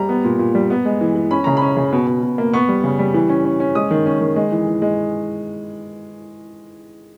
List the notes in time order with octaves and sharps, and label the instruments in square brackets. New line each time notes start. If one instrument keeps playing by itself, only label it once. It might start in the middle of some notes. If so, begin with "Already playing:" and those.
Already playing: [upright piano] G3 A#5
B3
A#2
A#2
G3
B3
G#3
E3
E3
C#4 B5
C#3 A#5
C#4 B5
C#3
B2
B2
B2
A#3
B3 C#6
G3
C#3
G3
E3
C#4
C#4
C#4
G#3 D#6
D#3
C#4
D#3
G#3
E3
E3
G#3